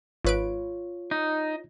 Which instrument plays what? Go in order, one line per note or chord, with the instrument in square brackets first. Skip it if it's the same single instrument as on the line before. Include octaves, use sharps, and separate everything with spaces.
[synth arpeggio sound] G#1 B4 D7 [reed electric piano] F4 C#5
[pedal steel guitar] D#4